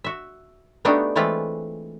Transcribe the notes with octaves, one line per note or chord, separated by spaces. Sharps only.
F#4 E5
A3 B3 D4 D#4 F#4 G4
E3 G#3 A3 C4 F4 B4